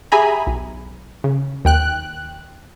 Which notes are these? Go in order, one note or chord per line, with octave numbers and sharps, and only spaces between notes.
G4 G#4 E5 G#5 A#5 B5
B1
C#3
D#2 G5 F#6